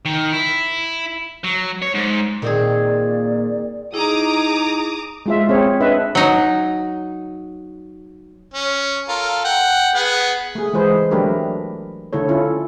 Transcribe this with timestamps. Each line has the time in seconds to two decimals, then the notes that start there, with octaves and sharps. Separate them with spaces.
0.06 D#3
0.32 E4
1.44 F#3
1.82 C#5
1.94 G#2
2.42 A#2 D#3 C4 G#4 D5
3.94 D#4 E4 G#4 A#5 D6 D#6
5.26 G#3 F4 E5
5.49 C4 G#4 C#5
5.80 D4 B4 D#5 E5
6.15 F#3 D#4
8.54 C#4
9.09 F4 A4 A#4
9.44 F#5 G5
9.95 B3 G#4 F#5
10.55 A3 G#4
10.73 E3 G#3 G#4 B4 C5
11.11 F#3 A3 D4 G4 A#4 B4
12.13 D3 A3 E4 A4 C#5
12.29 C#4 E4 F4 A4